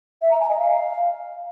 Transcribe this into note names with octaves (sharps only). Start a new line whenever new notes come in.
E5
A#5
G#5
D#5
F5